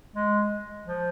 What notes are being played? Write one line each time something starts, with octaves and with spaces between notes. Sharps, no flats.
G#3
F3